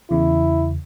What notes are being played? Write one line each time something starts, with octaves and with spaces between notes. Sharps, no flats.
E2 C#3 E4